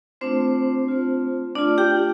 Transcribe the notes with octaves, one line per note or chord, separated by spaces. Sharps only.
A3 C4 D4 F4 C5
A3 F4
A3 D4 F4 D5
G4 G5